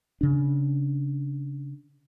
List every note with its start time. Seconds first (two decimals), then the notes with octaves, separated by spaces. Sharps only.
0.21 C#3 D4